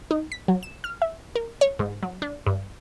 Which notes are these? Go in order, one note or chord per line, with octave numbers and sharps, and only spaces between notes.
D#4
B6
F#3
E7
F6
E5
A#4
C#5
G#2
F#3
D4
G2